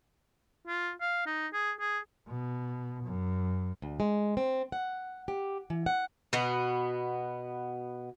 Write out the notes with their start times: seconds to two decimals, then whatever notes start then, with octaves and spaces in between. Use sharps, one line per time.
0.67 F4
1.01 F5
1.26 D#4
1.53 G#4
1.80 G#4
2.28 B2
3.04 F#2
3.82 D2
4.00 G#3
4.37 C4
4.72 F#5
5.28 G4
5.70 E3
5.86 F#5
6.33 B2 B3